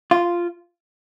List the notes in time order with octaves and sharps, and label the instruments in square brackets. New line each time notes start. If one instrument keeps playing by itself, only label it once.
[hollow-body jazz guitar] F4